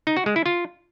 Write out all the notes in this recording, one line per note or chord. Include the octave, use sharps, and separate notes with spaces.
D#4
F#4
G#3
E4
F4